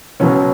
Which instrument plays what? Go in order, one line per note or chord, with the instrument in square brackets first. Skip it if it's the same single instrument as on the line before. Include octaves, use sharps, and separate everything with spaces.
[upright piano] C#2 B2 F#3 B3 C#4